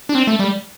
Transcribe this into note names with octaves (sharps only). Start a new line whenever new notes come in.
D4
C4
A3
G3